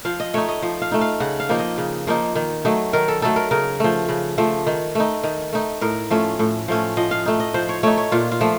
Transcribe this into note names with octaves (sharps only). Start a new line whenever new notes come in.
F3 F5
D#5
A3 D#4 C#5
D#5
F3
F5
A3 D#4
F5
C#3 F#5
F5
F3 A#3 D#4
D#5
C#3
F3 A#3 D#4
D#3
F#3 A3 D#4
D#3 A#4
A4
F#3 A3 D#4 A4
A#4
C#3 A#4
F3 A3
C#3
F3 A3
D#3
A3 D#4
D#3
A3 D#4
A2 A#4
F3 A3 C#4
A2
F3 A3 C#4
F3 D#5
F5
A3 D#4
D#5
F3 C5
C#5
A3 D#4 C#5
C#5
A#2 F4
F4
F3 A3